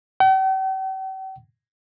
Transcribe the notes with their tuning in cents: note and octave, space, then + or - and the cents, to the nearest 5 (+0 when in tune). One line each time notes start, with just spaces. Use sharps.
G5 -45